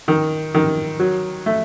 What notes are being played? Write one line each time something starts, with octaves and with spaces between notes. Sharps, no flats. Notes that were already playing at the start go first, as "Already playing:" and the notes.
D#3
D#3
F#3
A3